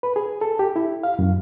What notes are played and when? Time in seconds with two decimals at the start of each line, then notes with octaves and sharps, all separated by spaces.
0.03 B4
0.16 G#4
0.41 A4
0.59 G4
0.76 E4
1.03 F5
1.19 F#2